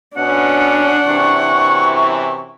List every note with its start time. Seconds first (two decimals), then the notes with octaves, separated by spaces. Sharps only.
0.17 B2 C#4 D4 F#5
1.06 F#2 C3 E3 C#6